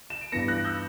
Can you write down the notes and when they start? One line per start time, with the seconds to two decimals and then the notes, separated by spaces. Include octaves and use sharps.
0.10 E7
0.21 D7
0.32 G2 E3 B3 A#6 C#7
0.48 F#6 A#6
0.65 E6 G6